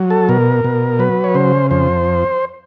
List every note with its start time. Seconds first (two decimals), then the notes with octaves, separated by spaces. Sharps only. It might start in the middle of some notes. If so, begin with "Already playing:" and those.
Already playing: F#3
0.10 A4
0.29 B2 A#4
0.64 B2
0.99 F#3 B4
1.24 C#5
1.35 C#3 C5
1.71 F2 C5